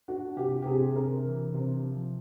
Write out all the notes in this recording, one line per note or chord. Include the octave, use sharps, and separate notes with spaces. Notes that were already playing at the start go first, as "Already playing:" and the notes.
D4 F#4
C3 G4
G4
C3 G#4
C3 A#4
E3
C3
F3